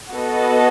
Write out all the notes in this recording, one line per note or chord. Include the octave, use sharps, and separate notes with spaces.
B3 F#4 A4 D#5 A5